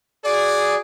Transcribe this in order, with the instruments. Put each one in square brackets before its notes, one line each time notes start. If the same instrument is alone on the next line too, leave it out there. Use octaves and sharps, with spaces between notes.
[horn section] F#4 G#4 [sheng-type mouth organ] D5